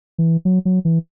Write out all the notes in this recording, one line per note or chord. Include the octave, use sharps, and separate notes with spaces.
E3
F#3
F#3
E3